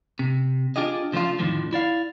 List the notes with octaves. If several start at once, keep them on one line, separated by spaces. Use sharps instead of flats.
C3
D4 F4 G4 G#4 D#5
C#3 F3 A3 D4 F4
F2 A2 D3 D#3 F3
E4 D5 F5